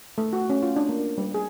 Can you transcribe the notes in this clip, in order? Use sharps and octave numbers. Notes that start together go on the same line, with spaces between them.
A3
F#4
C#4
F4
D4
A#3
G3
G#4